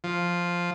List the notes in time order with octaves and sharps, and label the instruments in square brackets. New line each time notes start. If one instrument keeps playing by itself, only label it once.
[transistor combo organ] F3